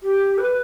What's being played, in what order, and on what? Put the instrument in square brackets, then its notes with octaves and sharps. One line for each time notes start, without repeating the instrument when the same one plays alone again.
[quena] G4
B4